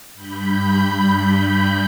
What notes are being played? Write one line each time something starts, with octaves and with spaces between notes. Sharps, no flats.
G2 B5 G6